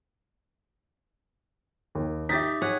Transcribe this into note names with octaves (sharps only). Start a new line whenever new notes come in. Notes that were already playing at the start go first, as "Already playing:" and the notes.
D#2
D#4 G4 E5 A6 B6
G#4 C#5 F#5